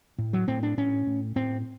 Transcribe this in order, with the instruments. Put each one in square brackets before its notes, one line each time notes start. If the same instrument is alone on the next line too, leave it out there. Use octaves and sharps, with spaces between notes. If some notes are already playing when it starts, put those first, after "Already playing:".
[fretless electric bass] A2
F#3
A2 C4
D4
A2 C#4
A2
A2 C4